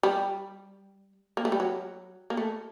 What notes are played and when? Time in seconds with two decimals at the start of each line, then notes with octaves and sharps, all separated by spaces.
0.03 G3
1.37 A#3
1.45 A3
1.52 G3
1.60 F#3
2.30 A#3
2.37 A3